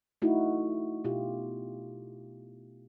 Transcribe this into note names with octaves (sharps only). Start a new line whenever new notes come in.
A3 D#4 E4 F#4
B2 F4 G4